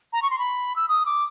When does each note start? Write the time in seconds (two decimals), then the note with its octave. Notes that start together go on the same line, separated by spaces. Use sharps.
0.13 A#5
0.22 C#6
0.30 C6
0.39 B5
0.76 E6
0.89 D#6
1.06 D6